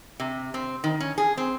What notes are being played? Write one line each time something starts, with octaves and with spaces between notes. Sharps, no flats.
C3
C4
D#3
C#4
G#4
C4